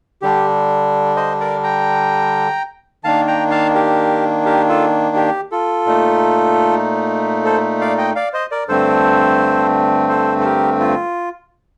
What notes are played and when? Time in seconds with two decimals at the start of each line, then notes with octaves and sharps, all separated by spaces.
0.22 D3 G3 D4 G4
1.16 C5 D#5
1.40 A#4 D5
1.63 G5 A#5
3.04 D#3 A#3 D4 F5 A5
3.28 G5 A#5
3.51 F5 A5
3.75 G4 A#4
4.46 G4 A#4
4.69 F4 A4
5.16 G4
5.52 F4 A4
5.86 A#2 A3 D#4
7.45 A4 C5
7.81 D5 F5
7.98 D#5 G5
8.15 D5 F5
8.33 C5 D#5
8.51 A#4 D5
8.68 G2 D3 A3 C4 A4 C5
10.09 A4 C5
10.41 A4
10.45 G4 A#4
10.80 F4